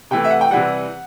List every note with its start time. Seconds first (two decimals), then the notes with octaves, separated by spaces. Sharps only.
0.11 C3 E3 A3 G5
0.24 E5
0.31 F#5
0.41 G5
0.51 C3 E3 G3 F#5